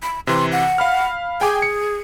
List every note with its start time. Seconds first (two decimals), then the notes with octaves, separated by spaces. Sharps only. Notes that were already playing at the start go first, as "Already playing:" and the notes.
0.03 B5
0.27 C3 E3 C6
0.52 F#5
0.78 F5 B5 F6
1.41 G#4 G5 G#5 D6
1.62 C#7